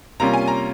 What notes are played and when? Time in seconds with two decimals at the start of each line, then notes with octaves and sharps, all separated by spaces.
0.20 C3 G3 A#3 C#4 F4 A#5
0.33 G#5
0.48 A#5